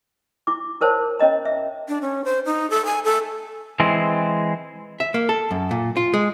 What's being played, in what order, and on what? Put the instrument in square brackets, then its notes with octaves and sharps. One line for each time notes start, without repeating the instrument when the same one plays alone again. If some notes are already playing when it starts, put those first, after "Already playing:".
[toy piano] E4 D6
E4 A#4 C5 C#5 A5
C#4 C#5 D#5 A#5
E5
[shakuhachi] D4
C#4
C5
D#4
A4
G#5
A4
[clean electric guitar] E3 G#3 C4
[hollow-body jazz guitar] E5
A#3
A4
F#2
A#2
F4
G#3